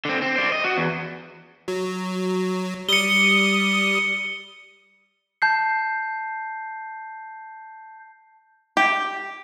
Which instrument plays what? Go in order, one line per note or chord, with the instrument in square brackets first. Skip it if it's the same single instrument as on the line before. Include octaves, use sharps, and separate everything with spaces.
[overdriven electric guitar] D3 C4
C4
C5 D5
D#5
F#4
E2
[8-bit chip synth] F#3
[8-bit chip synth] G3 D#6 [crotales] C#7 G7
[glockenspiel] A5 G6 C7
[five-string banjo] G4